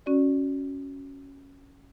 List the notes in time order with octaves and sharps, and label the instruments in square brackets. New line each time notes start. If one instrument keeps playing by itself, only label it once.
[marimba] C#4 F#4 D5